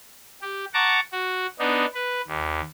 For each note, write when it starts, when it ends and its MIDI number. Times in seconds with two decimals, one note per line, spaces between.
0.42 0.65 67
0.74 1.00 78
0.74 1.00 81
0.74 1.00 82
0.74 1.00 85
0.74 1.00 86
1.12 1.47 66
1.59 1.86 59
1.59 1.86 62
1.59 1.86 63
1.94 2.21 71
2.28 2.61 39